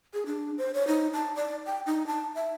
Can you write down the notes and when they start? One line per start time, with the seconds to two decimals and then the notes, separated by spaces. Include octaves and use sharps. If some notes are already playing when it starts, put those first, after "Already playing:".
0.14 G#4
0.26 D4
0.58 C5
0.74 C#5
0.88 D#4
1.13 A5
1.36 D5
1.66 G5
1.86 D#4
2.07 A5
2.35 E5